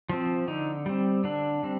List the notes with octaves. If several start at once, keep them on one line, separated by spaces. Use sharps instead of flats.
F3 C4
D3 D#4
G3 C4
D3 D4
G3 C4